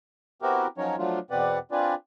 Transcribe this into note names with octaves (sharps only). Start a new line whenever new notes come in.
B3 C4 E4 F#4 G4 A#4
F3 F#3 C#4 D#4 A#4 C#5
F3 F#3 A3 D4 F4
E2 B2 C4 B4 D5 F#5
C4 D4 F4 G#4 B4 D5